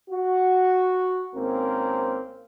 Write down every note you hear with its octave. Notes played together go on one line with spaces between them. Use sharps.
F#4
G#1 G#2 A#3 C4 C#4 A#4